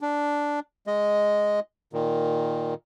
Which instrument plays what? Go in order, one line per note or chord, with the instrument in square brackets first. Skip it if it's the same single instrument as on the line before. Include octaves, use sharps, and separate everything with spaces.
[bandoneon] D4
G#3 D#5
A#2 D#3